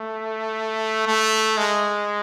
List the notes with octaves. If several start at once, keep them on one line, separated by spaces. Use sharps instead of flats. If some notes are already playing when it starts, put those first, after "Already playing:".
Already playing: A3
A3
G#3